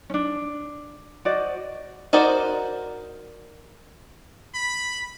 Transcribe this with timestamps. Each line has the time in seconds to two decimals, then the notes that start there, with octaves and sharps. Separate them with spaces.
0.10 C#4 D4
1.25 F#4 C5 D5 D#5
2.13 D#4 F#4 A#4 C5 D5
4.54 B5